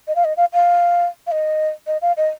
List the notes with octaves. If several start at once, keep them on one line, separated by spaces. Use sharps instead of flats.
D#5
F5
D#5
F5
F5
F5
D#5
D#5
F5
D#5